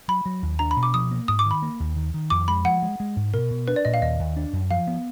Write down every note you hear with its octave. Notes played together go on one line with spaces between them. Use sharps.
F#3 B5
F#3
D#2
D4 A#5
B5
B2
D6
F3 D#6
A#3
G#2 D#6
D6
D#3
B5
A#3
D#2
D#3
D#3
F2 D6
G#3 B5
F3 F#5
G#3
G#3
G#2
B2 A#4
B2
D4 B4
D5
A#2 D#5
F5
D#2 D#5
D#2
D4
F#2
F3 F5
B3